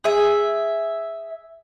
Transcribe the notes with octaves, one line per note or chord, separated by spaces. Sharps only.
G#4 E5